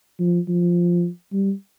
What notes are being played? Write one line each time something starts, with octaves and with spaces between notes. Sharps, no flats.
F3
F3
G3